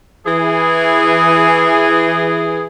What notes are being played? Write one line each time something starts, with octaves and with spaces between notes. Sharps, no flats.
E3 G#4